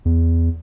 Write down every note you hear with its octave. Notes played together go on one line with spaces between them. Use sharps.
E2